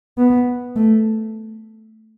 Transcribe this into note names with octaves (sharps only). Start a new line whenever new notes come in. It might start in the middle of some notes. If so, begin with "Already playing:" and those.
B3
A3